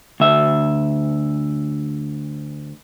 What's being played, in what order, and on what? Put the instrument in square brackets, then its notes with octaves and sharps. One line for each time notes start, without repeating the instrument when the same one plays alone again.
[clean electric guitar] D2 E5